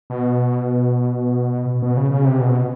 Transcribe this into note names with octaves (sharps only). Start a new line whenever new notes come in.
B2
B2
C#3
C#3
C3
B2